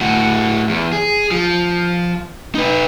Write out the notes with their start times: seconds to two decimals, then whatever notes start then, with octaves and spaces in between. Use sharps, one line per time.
0.01 A2 F#4
0.69 E2
0.92 G#4
1.31 F3
2.55 D#4 B4